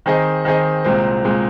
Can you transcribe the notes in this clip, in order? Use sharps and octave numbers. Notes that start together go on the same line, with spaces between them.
D#3 C4 G#4 D#5
D#3 C4 G#4 D#5
C2 A#2 G#3 C4
A#2 G#3 C4